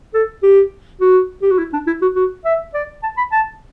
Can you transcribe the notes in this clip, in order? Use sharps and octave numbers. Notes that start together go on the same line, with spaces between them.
A4
G4
F#4
G4
F#4
E4
D4
E4
F#4
F#4
E5
D5
A5
B5
A5